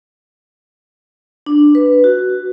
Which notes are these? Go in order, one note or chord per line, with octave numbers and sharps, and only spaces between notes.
D4
B4
F#4